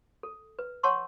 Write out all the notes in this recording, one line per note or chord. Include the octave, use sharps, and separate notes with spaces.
A4
B4
C#5 F#5 A5 C6 C#6 E6